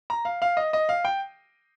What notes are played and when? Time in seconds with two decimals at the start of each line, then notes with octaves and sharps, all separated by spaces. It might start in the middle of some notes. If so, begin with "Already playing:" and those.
0.10 A#5
0.25 F5
0.42 F5
0.57 D#5
0.73 D#5
0.89 F5
1.05 G5